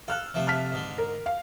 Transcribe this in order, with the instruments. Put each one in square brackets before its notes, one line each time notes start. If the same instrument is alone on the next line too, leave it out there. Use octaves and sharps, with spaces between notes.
[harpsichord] A4 [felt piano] F5 F6 F#6
[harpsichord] C3 F3 A3
[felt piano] A5 F6 B6
[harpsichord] G#2 D3
[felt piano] A#4
F5